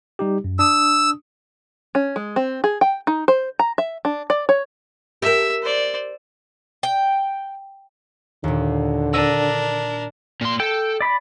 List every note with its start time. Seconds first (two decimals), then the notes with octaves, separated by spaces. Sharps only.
0.19 G3 D#4 G4
0.44 F#2
0.59 D4 D#6 E6
1.95 C#4
2.16 G#3
2.36 C4
2.64 G#4
2.81 G5
3.07 D#4
3.28 C5
3.59 A#5
3.78 E5
4.05 D4
4.30 D5
4.49 C#5
5.22 G4 A#4 E5
5.62 C5 D5
6.83 G5
8.44 D#2 A#2 D3
9.13 D4 A#4 E6 A#6 D#7
10.41 A#2 C6
10.60 A4 G5
11.01 D5 B5